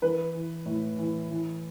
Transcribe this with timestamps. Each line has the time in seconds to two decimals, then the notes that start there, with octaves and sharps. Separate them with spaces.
0.02 E3 B4
0.34 E3
0.66 A2
0.98 E3
1.31 E3